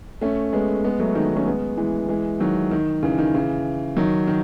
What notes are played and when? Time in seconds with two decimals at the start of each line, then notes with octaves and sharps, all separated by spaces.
0.21 A3 C#4
0.53 G#3 B3
0.84 G#3 B3
1.00 F#3 A3
1.15 D#3 F#3
1.26 D#3
1.37 A3 C#4
1.47 G#3 B3
1.77 E3 G#3
2.09 E3 G#3
2.40 D#3 F#3
2.71 D#3
3.03 C#3 E3
3.19 D#3
3.34 C#3 E3
3.97 D#3 F#3
4.28 D#3